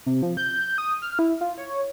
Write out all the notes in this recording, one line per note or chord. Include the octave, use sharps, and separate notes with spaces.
C3
F3
G6
D#6
F6
E4
F4
C#5